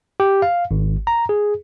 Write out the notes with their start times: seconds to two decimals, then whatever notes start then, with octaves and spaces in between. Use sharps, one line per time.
0.20 G4
0.42 F5
0.71 G#1
1.07 A#5
1.29 G#4